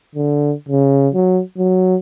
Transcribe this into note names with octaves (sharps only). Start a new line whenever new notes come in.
D3
C#3
F#3
F#3